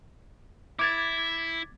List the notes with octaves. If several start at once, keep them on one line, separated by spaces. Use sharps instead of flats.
E4 D6 G#6 A6